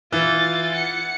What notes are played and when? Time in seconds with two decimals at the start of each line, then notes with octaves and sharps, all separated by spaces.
0.12 E3 F4 A6
0.74 F#5 C#7